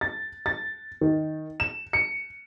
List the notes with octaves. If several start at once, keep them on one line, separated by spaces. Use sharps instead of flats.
A6
A6
D#3
E7
C#7